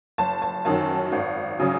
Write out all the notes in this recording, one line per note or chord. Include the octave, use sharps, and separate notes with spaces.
F#1 A5
A5
F#2 D#3 F#3 A5
G#1
C#3 F#3